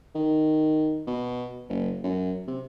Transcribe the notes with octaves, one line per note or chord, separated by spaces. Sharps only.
D#3
B2
F#1
F#2
C3